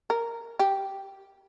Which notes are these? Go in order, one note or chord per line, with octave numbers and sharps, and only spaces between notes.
A#4
G4